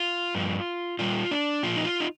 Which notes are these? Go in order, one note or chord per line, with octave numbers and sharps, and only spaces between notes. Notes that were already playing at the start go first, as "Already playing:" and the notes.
Already playing: F4
G2 F3
A#2 G3 F4
D4
A#2 F3 F4
D#4
F4
D#4